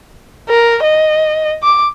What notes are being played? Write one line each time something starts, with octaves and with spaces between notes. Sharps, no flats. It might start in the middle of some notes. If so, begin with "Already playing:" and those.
A#4
D#5
D6